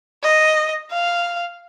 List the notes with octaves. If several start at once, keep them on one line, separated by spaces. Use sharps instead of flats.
D#5
F5